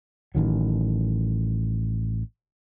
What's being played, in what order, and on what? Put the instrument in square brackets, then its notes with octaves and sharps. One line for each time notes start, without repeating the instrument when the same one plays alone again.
[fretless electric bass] A1 D#3 F#3